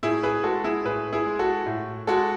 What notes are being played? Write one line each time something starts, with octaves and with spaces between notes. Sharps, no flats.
A2 E4 G#4
G#4 B4
G#3 F#4 A4
E4 G#4
A2 G#4 B4
E4 G#4
G#3
F#4 A4
A2
G#3 F#4 A4